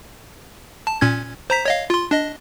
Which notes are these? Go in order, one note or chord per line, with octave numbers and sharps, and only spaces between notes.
A5
A#2 C#4 G#6
C5 A#5 B6
C#5 D#5 F5
F4 C6
D4 D#5